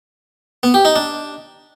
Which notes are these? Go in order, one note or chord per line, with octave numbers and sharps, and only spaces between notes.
B3
G4
D#4
D4